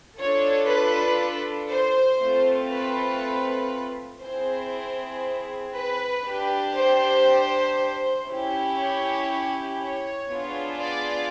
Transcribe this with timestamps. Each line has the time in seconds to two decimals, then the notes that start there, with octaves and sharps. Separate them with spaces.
0.17 D4 F4 A4 C#5
0.67 B4
1.69 C5
2.20 A3 C4 F4
2.71 B4
4.22 C4 E4 G#4 C5
5.75 B4
6.25 D4 G4
6.75 C5
8.27 C#4 E4 G4
8.79 C#5
9.80 C#5
10.30 B3 D4 F4 G#4
10.80 D5